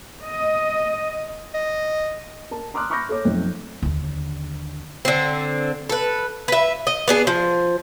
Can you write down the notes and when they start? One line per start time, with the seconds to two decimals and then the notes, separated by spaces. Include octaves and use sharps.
0.24 D#5
1.54 D#5
2.51 A#4 A5
2.74 A#5 C6 D6 D#6 F6 F#6
2.90 B5 C#6 D6 F6 G6 A#6
3.09 A4 C#5 D6
3.25 B1 F2 A3
3.82 D#2 D3
5.05 D3 C4
5.89 A4 B4
6.48 B4 E5
6.87 D#5
7.08 B3 D4 G#4
7.27 F3